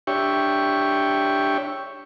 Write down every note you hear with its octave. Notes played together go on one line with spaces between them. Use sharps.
D4 G4 C#5 E5 G5 C#6